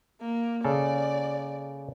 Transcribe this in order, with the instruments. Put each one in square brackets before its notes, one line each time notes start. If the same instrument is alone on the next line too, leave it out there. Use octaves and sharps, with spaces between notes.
[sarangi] A#3
[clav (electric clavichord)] C#3 A4 F5 [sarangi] D5